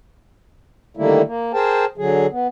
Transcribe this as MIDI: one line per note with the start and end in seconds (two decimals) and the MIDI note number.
0.97 1.22 50
0.97 1.22 51
0.97 1.22 55
0.97 1.22 57
0.97 1.22 58
0.97 1.22 64
1.25 1.52 58
1.54 1.85 68
1.54 1.85 70
1.54 1.85 72
1.54 1.85 79
1.54 1.85 81
1.98 2.26 50
1.98 2.26 54
1.98 2.26 68
2.31 2.47 59